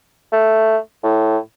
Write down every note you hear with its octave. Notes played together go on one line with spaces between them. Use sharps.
A3
A2